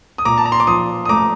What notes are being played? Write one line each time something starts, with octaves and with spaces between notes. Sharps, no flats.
D#6
A#2 A#5 D6
A5
A#5
C6
D6
F3 C6 D#6
D#6
A3 A#5 D6